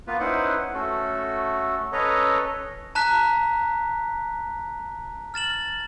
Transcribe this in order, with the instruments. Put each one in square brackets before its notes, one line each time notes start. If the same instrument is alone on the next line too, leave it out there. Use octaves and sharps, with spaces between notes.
[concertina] A#3 B3 F4 B4
C#4 D#4 E4 B4 C5 F#5
A3 C#4 F#4 A4
C#4 A4 B4 C#5 D#5 A#5
[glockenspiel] A5 A#5 F#6 B6
F6 A6 E7 F#7